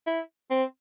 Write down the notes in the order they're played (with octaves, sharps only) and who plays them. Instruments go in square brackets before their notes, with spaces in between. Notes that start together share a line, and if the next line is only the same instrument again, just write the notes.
[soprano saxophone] E4
C4